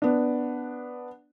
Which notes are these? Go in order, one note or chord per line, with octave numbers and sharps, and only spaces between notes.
B3 D4